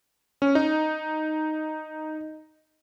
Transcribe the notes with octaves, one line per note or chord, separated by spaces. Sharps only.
C#4
D#4